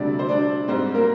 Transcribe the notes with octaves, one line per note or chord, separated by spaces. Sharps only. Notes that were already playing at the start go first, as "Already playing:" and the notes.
Already playing: D2 C3 G3 C4 D4 D5
C5
D4 D5
G#2 G3 C4 C5
A#3 A#4